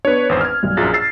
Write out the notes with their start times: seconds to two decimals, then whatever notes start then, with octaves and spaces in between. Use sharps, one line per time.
0.05 B3 D4 B4 C#5
0.29 G#1 E2 C5
0.41 F6 G#6
0.63 B1 G2
0.77 A#1 F#2 F4 G#4 A6
0.94 E6 A6 C7